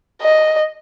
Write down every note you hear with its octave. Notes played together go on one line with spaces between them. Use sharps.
D#5